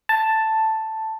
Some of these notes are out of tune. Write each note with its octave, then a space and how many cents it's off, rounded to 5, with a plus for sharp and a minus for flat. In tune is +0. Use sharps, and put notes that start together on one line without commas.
A5 +5